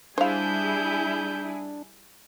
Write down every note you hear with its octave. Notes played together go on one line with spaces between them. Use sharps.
G3 D4 E4 G#4 C5 F5 G6